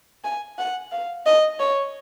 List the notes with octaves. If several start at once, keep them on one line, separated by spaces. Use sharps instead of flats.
G#5
F#5
F5
D#5
C#5